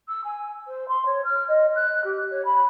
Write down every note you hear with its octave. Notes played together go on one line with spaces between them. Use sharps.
E6
G#5
C5
C6
C#5
F6
D#5
F#6
G4
C#5
B5